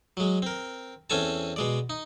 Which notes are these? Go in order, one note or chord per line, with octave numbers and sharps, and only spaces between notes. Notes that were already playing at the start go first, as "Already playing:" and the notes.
F#3 G#3
C4 A#4
E2 C4 C#4 A4 G#5 A5
B2 G#3 D5
D#4